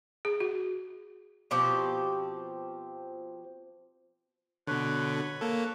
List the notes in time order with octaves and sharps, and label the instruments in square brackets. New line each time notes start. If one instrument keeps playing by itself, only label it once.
[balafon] G#4
F#4
[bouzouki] B2 F3 C4 G4
[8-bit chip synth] B2 D3 [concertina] B4 C#5
[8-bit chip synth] A#3 A4